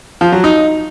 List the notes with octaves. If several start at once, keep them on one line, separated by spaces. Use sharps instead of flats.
F3
F#3
D#4